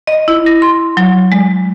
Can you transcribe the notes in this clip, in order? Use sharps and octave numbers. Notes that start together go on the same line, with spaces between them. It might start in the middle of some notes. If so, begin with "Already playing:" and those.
D#5
E4
A#6
C6
F#3
G#3